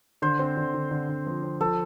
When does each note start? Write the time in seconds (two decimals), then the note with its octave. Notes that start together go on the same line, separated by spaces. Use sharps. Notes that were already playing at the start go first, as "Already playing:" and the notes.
0.22 D3 C5
0.39 C4
0.57 D3
0.74 D3
0.91 D3
1.09 D3
1.26 F3
1.43 C4
1.61 F3 A4